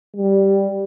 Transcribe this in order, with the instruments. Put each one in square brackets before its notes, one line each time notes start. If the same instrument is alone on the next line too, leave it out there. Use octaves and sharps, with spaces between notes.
[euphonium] G3